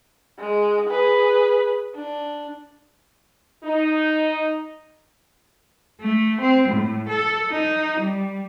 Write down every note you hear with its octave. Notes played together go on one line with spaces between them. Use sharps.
G#3
G#4 B4
D4
D#4
A3
C4
A2
A4
D#4
G3